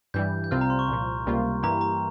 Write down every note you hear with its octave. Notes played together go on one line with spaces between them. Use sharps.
G2 E3 G3 G6
G6
C2 C3 G3 C4 F4 F6
A#5
C6
C#6
C2 A#2 F3
C#2 C3 G3 A#3 F4
G2 E3 A#3 E4 G4 A#5
A#5